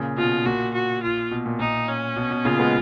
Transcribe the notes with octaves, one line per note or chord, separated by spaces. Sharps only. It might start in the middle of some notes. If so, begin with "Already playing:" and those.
Already playing: A#2 C#3
B2 F4
A#2 F#4
F#4
F4
B2
A#2
A#2 D#4
C#4
B2
B2
A#2 C#3 F4
G#3 B3